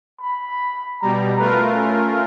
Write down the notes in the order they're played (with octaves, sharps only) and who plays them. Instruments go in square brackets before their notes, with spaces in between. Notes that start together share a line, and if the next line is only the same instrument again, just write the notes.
[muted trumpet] B5
[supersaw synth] B2 G3 [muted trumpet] A#5
[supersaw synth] A3 F4 A#4 [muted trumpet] B4
[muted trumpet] C#4